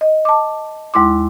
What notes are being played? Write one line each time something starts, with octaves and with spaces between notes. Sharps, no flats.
D#5
A5 D6
D#2 G#3 E4 C6 D6